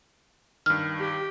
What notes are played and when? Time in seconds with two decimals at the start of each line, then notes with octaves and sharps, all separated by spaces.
0.66 G2 D#3 F6
0.98 G4